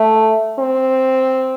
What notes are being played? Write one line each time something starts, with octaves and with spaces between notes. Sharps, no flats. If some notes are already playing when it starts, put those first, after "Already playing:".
Already playing: A3
C4